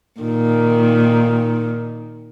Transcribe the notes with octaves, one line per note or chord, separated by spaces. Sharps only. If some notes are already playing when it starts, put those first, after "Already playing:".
A#2 D#3